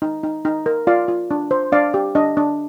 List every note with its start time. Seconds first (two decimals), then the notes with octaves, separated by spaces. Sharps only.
0.02 D#4
0.23 D#4
0.45 D#4
0.66 A#4
0.87 F4 D5 F5
1.08 F4
1.31 D4
1.51 C5
1.72 D4 D5 F5
1.94 G4
2.15 D4 D#5
2.37 D4